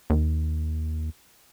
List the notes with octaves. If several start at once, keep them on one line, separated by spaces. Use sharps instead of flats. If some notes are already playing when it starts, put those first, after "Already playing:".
D#2